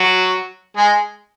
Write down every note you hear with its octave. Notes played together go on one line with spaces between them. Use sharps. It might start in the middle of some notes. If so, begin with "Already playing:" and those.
Already playing: F#3 F#4
G#3 G#4